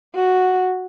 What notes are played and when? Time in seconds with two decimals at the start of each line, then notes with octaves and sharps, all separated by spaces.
0.15 F#4